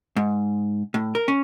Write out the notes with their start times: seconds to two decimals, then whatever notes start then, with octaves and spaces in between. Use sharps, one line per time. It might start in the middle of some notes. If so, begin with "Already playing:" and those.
0.16 G#2
0.94 A2
1.15 A#4
1.28 C#4